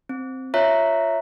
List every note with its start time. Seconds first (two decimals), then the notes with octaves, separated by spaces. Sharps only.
0.09 C4
0.54 F4 C#5 E5 A#5 F#6 B6